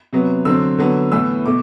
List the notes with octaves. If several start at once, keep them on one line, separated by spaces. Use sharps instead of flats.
C3 F#3 B3
D3 F#3 C4 E6
D3 F#3 B3
A2 E3 B3 E6
B2 A3 D6